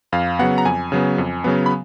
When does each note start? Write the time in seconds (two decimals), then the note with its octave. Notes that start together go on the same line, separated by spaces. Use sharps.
0.13 F2 F5
0.39 C#3 F#3 B3 F#5
0.58 A#5
0.65 F2 G#5
0.92 C#3 F#3 B3
1.18 F2
1.44 C#3 F#3 B3
1.66 B5